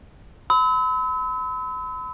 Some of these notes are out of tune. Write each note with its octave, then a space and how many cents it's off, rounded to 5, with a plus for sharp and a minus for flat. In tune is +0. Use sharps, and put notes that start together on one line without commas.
B5 +40 E6 -35